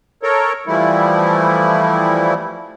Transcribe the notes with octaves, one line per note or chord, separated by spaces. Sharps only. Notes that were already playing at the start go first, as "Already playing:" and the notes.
A4 A#4 C#5
E3 F3 G3 A3 E4